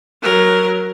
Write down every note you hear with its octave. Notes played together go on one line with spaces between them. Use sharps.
F#3 A#4